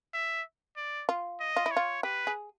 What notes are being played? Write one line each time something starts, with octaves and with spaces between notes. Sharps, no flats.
E5
D5
F4
D#5
F4
E4
C#5
F4
G4 B4
G#4